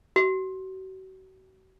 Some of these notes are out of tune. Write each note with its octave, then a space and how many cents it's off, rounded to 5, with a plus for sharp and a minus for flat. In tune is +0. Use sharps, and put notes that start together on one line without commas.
F#4 +35